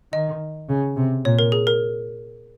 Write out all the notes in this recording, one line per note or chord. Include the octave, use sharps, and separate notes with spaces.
D#3 D#5
C#3
C3
A#2 C#5
A#4
G#4
A#4